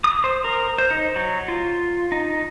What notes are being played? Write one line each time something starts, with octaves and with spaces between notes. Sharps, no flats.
D#6
C5
A#4
C5
D#4
F#3
F4
D#4